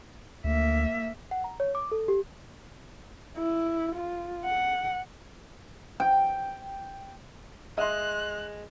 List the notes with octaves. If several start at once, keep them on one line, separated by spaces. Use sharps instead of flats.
D2 A#3 E5
F#5
A#5
C#5
D6
A4
G4
E4
F4
F#5
G5
G#3 D#5 E5 C6 F#6